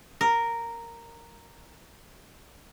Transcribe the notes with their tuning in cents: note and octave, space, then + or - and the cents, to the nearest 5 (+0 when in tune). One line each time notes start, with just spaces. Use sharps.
A#4 -5